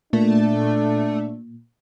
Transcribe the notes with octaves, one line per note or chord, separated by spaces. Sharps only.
A#2 A3 D4